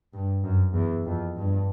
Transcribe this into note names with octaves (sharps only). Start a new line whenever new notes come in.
G2
F#2
E2
F2
G2